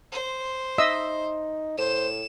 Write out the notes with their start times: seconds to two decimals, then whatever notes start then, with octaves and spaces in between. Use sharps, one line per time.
0.12 C5
0.78 D#4 D#5 E5 E6
1.78 A2 C5 E7